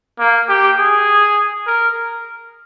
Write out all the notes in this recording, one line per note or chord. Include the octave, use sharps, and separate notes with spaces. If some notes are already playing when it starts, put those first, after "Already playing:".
A#3
G4
G#4
A#4